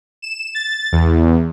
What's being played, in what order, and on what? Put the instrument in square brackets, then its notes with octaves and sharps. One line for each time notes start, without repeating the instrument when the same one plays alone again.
[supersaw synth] E7
A6
E2